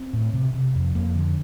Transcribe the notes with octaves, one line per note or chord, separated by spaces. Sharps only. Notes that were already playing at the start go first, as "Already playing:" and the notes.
Already playing: C4
A2
C3
C3
F2
F2 A#3
D3